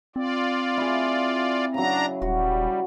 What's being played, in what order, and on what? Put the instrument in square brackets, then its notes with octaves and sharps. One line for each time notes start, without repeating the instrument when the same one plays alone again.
[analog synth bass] C4 [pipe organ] F4 D5
[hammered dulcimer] E4 G#4
[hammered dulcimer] C#3 F#3 [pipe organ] D4 A#5
[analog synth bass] D#1 [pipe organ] G3 [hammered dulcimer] F#4